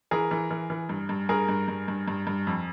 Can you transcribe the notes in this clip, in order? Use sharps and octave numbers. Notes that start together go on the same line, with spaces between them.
E3 G#4 A#4
E3
E3
E3
G2
G2
G2 G#4 A#4
G2
G2
G2
G2
G2
F2